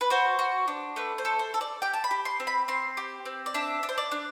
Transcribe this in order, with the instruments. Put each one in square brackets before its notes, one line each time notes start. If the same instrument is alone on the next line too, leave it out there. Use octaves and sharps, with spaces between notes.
[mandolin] B4
F#4 C5
F#4
D4
A3 B4
C5
A4
C5
A4
D5
G4 G5
A5
B5
G4
C6
C4
B5
C4 C6
G4
C4
D5
D4 E5
D4
C5
D5
D4